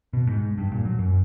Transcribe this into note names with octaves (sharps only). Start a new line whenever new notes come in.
B2
G#2
G2
A#2
F#3
F#2